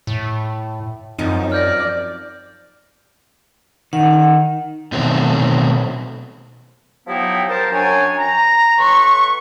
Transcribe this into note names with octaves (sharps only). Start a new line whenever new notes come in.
A2
F#2 F3 C4 D#4
D5 F6 G6 A#6
D#3 F#5
B2 D#3 F#3 A3 C4
F3 F#3 B3 D#4 E4 G4
A#4 C5 A5
F#2 F#3 D4 C#5 G5 G#5
A#5
A2 B4 C6 C#6